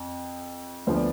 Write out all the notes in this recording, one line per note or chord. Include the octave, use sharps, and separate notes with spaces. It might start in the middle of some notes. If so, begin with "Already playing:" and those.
Already playing: F2
D2 D3 F3 B3 C5
D5